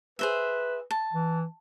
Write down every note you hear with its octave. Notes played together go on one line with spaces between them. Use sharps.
G#4 B4 C5 E5
A5
E3